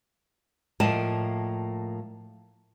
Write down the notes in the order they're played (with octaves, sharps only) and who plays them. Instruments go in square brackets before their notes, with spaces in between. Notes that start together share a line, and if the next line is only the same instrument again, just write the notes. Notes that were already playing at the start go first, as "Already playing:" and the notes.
[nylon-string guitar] A2 F3 A#3 D5 D#5 A5